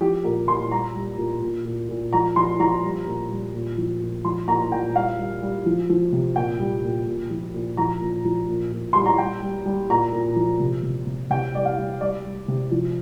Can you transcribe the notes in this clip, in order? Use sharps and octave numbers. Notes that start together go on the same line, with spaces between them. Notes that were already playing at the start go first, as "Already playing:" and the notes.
F3 G4
A#2 A#4
A#2 C6
G3 A#5
G3
A#2
A#2
A#2
A#2
F3 A#5
F3 C6
F3 A#5
G3
A#2
G3
A#2
F3
A#2
F3 C6
A#2 A#5
A#2 G5
G3 F5
G3
G3
F3
F3
C3
A#2 G5
G3
A#2
A#2
F3
A#2
F3 A#5
A#2
F3
A#2
A#2
G3 C6
A#5
G3 G5
G3
G3
A#2 A#5
A#2
F3
C3
C3
C3
C3 G5
G3 D5
F5
G3
G3 D5
G3
C3
F3